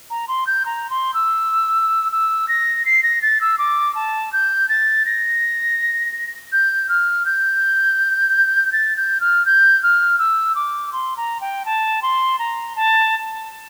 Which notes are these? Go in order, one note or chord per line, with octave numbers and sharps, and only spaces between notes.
A#5
C6
G6
A#5
C6
E6
E6
A#6
C7
A#6
A6
E6
D6
A5
G6
A6
A#6
G6
F6
G6
A6
G6
F6
G6
F6
E6
D6
C6
A#5
G5
A5
C6
A#5
A5